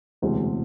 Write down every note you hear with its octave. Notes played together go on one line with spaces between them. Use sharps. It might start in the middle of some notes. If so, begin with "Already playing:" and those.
E1 D2 C3 E3 G#3